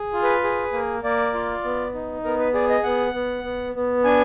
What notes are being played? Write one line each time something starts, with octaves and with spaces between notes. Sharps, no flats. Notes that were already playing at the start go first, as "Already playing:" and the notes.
Already playing: G#4
F4
B4
G#4
A#3
A#3 D5
F4
B3
D#4
B3 A#4
B4
G#4 D5
D#5
B3 F#5
B3
B3
B3
D4 G#5